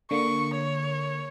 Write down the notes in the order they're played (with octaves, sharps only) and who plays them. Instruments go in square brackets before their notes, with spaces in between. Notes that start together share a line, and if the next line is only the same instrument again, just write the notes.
[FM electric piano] D3 A#3 [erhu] C#6
[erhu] C#5